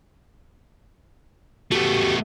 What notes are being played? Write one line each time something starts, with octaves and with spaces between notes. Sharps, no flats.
A3 B3 F#4 G4